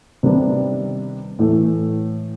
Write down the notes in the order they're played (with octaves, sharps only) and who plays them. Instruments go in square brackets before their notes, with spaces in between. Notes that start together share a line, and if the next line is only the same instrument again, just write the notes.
[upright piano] C3 D#3 G3 B3 D4
A2 E3 A3